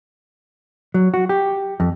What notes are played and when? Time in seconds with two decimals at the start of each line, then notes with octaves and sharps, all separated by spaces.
0.94 F#3
1.14 F#4
1.29 G4
1.80 F2